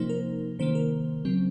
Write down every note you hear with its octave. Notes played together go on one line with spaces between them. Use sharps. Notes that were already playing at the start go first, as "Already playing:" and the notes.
Already playing: C3 F3 A#3 D#4 C5
A#4
C3 D#3 A#3 C5
A#4
C#3 F#3 C4